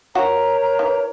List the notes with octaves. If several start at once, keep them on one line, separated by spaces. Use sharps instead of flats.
F#4 A#4 C#5 F#5 A#5
E3